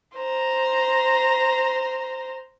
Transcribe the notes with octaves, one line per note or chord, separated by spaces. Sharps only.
C5 A#5